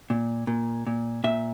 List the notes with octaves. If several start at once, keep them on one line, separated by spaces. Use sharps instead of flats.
A#2
A#2
A#2
A#2 E5